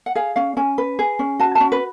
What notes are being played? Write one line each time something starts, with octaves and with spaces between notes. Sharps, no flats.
F#5
G#4 F5
C#4 F5
C#4 G#5
B4
G#4
C#4
F#4 A5
C#4 A5
B4